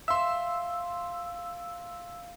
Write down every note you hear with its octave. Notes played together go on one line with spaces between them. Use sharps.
E5 F5 C6 E6